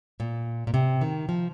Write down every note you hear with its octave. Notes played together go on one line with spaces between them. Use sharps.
A#2
A#2
C3
D#3
F3